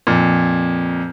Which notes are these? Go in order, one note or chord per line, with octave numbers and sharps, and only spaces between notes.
F2 A#2